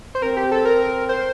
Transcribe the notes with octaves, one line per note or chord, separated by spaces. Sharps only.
C5
C4 A#4
G4
A4
A#4
C5